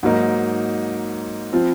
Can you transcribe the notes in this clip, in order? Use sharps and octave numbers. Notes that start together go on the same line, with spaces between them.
G#2 F#3 A#3 D#4
F3 C4 F4